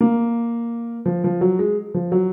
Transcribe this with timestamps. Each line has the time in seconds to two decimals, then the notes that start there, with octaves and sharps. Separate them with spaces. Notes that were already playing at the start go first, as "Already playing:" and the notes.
0.01 A#3
1.05 F3
1.24 F3
1.41 F#3
1.59 G#3
1.94 F3
2.12 F#3